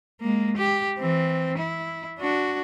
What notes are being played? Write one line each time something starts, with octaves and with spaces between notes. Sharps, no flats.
G#3 A#3
G4
E3 C4
E4
D4 F#4